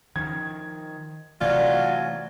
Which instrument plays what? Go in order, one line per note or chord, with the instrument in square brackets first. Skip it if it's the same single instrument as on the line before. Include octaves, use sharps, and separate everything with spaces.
[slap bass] D#3 F3 [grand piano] G#6
[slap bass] C3 E3 A3 [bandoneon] F#3 F#4 G#5 [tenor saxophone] F4 [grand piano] D5